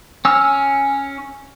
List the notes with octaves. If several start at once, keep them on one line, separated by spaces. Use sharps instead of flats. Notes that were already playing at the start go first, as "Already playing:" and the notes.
C#4 E6 F6